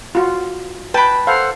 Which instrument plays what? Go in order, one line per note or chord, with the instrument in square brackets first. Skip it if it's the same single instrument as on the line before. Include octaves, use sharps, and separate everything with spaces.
[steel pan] F4 F#4
[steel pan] B4 G5 [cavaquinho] A5 B5
[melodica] A4 C5 F#5 [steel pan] F5